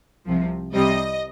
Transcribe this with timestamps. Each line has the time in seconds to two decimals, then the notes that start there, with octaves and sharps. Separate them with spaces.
0.26 C2 C3 F3
0.74 C2 C3 G3 D#5